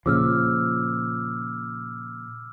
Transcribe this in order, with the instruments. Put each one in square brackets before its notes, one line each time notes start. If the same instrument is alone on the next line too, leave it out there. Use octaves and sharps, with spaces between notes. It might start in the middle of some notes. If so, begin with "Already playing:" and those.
[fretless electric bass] A#2 C#3 F3 [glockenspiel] D6 E6 F6